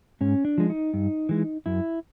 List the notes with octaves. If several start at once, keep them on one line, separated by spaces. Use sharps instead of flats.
G#2 C#4
D4
F3 G#3
D#4
G2
E3 G#3
F#2 E4